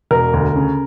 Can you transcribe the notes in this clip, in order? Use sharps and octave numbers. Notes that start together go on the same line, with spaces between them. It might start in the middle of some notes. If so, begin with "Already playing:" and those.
E1 A#4
D2
C#3